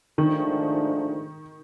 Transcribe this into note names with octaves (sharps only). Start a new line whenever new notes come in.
G#2 D#3 F3 A3 D4